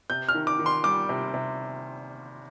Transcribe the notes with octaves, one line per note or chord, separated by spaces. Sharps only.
C3 G6
F6
D#3
D6
D#3
C6
G3 D6
C3
C3